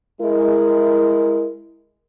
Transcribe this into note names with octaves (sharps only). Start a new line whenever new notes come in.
G#3 E4 A#4